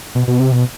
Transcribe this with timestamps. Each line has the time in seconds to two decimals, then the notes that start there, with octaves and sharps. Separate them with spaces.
0.15 B2
0.28 B2
0.40 C3
0.52 B2